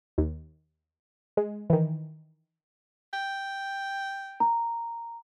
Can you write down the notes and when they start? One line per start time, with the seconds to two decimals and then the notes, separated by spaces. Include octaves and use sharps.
0.18 D#2
1.37 G#3
1.70 D#3 E3
3.13 G5
4.40 A#5